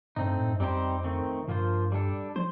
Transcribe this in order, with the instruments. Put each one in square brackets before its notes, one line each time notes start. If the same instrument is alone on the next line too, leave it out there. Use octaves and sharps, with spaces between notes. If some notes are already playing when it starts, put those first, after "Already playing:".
[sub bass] G2 [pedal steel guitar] A3 C4 D#4
[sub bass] A2
G2
[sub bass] F2 [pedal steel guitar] G3 C4 D#4 G4 C5
[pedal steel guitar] D#3 A3 C4
[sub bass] G2 [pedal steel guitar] F3 A#3 F4 C5
[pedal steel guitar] G3 D4 A4
[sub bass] F3 [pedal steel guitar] C5